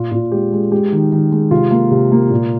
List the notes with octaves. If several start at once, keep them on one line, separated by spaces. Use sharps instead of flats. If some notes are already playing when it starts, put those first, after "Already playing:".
Already playing: A#2 F4
A#2
G#3 G4
G#3
G#3 G4
D#3
D#3
G#3
C3 F4
A#3
C3
A#3
A#2